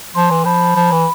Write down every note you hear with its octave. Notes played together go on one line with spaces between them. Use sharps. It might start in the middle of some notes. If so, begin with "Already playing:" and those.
F3 C6
E3
F3 B5
F3
E3